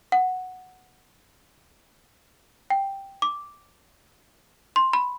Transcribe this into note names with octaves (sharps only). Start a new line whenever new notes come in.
F#5
G5
D6
C6
B5